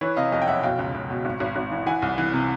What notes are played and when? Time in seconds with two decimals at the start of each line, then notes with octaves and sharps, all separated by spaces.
0.01 E3 B4 C#5
0.16 C3 D#5 F5
0.32 F2 D#5 F5
0.42 G5
0.47 F#1 E5 F#5
0.63 B2 F5 G5
0.79 C#2
0.94 C#2
1.10 B2
1.25 G#1
1.40 G#1
1.56 G#1
1.71 E3
1.86 E3 F#5 G#5
2.02 C2
2.18 E3
2.34 C3